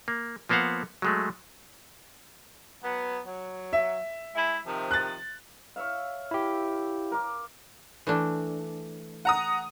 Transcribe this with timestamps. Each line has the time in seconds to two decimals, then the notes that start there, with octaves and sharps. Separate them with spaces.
0.08 A#3
0.49 F3 A#3 B3 C5 F5 F#5
1.02 F#3 G#3 A3
2.84 F#3 B3
3.26 F#3
3.73 E5
4.35 G#3 E4
4.66 C3 D#3 F3
4.91 F#6 A6
5.76 C#5 E5 F5
6.31 E4 G4
7.12 A#4 D6
8.07 E3 A3 D4
9.25 F#5 A#5 D#6